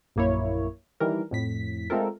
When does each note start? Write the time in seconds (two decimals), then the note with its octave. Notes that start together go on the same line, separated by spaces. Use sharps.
0.16 A#1 F#2 A#3 E4 C#5
1.00 D#3 E3 G3 A#4
1.31 F2 A2 B6
1.90 G#3 A3 C4 F4 A4 A#4